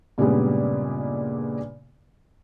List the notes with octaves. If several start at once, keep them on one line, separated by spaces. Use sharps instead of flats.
G2 A#2 C#3 G3 G#3 B3